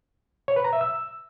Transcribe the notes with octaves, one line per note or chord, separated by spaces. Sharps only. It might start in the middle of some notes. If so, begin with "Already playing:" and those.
C#5
B4
A#5
E5
E6